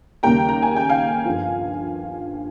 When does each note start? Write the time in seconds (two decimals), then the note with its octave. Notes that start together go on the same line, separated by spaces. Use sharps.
0.23 D#2 C#3 G3 A#3 G5 A#5
0.49 A#5
0.62 G#5
0.76 G5
0.89 F5 G#5
1.25 G1 G2 F3